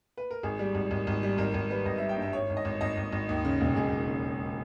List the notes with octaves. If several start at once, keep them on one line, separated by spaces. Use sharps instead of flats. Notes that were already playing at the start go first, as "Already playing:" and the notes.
B4
A#4
G#1 G#4
G3
G#1
G#1
G#1
G3
G#1 A#4
G#1 A#4
G3 B4
G#1 D#5
G3 E5
G5
G2 E5
G#1 C#5
G#1
D#5
G#1
G#1 D#5
G#1
G#1
D#2
C#3
E1
E1 G#4
D#2
C#3